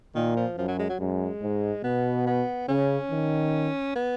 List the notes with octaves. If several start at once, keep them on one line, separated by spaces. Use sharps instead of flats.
A#2 D#3
F3
F#2 F3
F#3
G#3
F#3
F#2 G#3
G#2
B2 B3
B3
C#3 C#4
D#3
B3